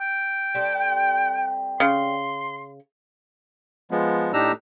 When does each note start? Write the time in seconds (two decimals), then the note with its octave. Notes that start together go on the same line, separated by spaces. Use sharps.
0.01 G5
0.54 G3 C4 A4
1.80 C#3 C6
3.91 F3 G#3 B3
4.33 A2 D4 D#4 G4 A#5 E6